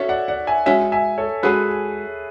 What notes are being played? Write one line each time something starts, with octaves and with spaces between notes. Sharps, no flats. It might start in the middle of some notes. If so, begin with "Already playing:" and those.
Already playing: C#4 F#4 A4 C#5 E5
D5 F#5
D5 F#5
E5 G#5
G#3 C#4 F#4 E5 G#5
E5 G#5
A4 C#5
G#3 C#4 F#4 G#4 B4